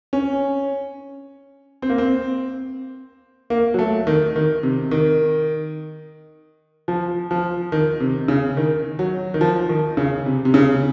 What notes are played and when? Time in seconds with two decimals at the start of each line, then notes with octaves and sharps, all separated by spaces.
0.13 C#4
1.82 C4
1.90 A#3
1.98 C4
3.50 A#3
3.74 F#3
3.79 A3
4.07 D#3
4.36 D#3
4.63 C3
4.91 D#3
6.88 F3
7.31 F3
7.72 D#3
8.00 C3
8.28 C#3
8.57 D#3
8.99 F#3
9.34 D#3
9.41 F3
9.69 D#3
9.97 C#3
10.26 C3
10.45 C3
10.54 C#3